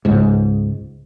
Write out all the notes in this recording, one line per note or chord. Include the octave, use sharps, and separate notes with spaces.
C#2 G#2